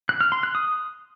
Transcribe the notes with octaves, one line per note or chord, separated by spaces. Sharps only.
F#6
F6
C6
F#6
D#6